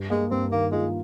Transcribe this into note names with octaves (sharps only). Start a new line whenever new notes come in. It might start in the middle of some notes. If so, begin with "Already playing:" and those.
Already playing: G2
G#3 A#3
G2 C4
D#3 A#3
G#3 F4